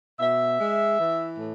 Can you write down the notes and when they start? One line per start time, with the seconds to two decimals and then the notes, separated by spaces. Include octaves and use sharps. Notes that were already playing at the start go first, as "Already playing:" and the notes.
0.19 B2 E5
0.60 G#3
0.99 E3
1.39 A2